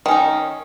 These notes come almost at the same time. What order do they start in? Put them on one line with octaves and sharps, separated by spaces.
D#3 C#4 D#4